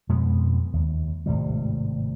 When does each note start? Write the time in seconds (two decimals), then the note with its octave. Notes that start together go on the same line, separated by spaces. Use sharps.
0.09 F2 B2 G#3 B3
0.73 D#2
1.26 G#1 A2 C3 G3